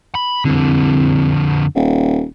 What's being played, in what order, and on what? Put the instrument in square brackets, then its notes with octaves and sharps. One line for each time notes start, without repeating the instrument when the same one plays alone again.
[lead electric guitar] B5
[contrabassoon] C2 [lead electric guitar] F2 D3
[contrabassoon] D#1